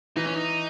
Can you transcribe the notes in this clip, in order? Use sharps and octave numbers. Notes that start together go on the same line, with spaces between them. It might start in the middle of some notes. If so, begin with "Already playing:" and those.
E3 D#4
C#4
D#4